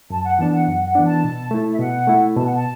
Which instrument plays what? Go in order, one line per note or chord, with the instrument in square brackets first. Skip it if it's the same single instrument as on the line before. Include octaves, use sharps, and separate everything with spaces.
[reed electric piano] F#2 [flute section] A5
[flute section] F#5
[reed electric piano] E3 B3 D4 [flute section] A5
[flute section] F#5
[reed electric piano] F#2 [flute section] F#5
[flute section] F#5
[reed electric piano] E3 B3 D4
[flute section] A5
[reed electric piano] B2
A3 E4
[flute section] E5
[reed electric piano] B2 [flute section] F#5
[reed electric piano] A3 E4
[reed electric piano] B2 [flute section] A5
[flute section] F#5
A5